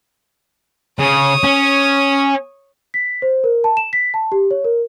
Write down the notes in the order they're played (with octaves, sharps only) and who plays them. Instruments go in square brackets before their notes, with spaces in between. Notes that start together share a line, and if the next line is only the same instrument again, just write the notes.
[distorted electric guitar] C#3 [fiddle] C#5 D#6
[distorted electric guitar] C#4
[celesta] B6
C5
A#4
A5
E7
B6
A5
G4
C#5
A#4